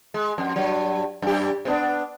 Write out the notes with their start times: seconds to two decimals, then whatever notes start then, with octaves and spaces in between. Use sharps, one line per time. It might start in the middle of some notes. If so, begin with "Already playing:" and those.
0.14 G#3
0.38 F2
0.56 G2 F#3
1.22 F#2 G4
1.65 C3 B3 D4